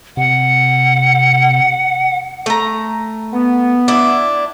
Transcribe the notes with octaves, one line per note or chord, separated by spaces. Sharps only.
C3 F#5
A3 A#5
B3
D4 E4